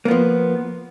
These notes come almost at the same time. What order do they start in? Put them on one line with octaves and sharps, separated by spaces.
A#3 B3 F3